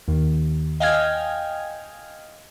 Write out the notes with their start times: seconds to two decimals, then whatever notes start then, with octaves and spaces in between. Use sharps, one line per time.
0.08 D#2
0.80 D#5 F5 G5 G#5 F6 G#6